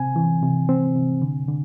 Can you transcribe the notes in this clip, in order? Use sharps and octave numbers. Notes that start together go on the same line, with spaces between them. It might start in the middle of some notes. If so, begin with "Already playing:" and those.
Already playing: C3 C4 G#5
E3
C3
C4
C3
D3
D3